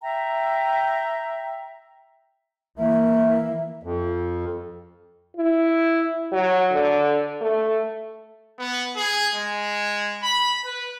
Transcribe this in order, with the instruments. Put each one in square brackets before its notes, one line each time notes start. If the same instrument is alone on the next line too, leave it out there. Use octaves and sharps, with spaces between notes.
[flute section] E5 G5 A#5
[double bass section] E3 A#3 [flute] E5
[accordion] F2
[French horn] E4
F#3
D3
A3
[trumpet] B3
G#4
G#3
B5
B4